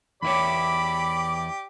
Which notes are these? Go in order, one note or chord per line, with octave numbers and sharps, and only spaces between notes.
E2 E4 G4 C#5 D5 B5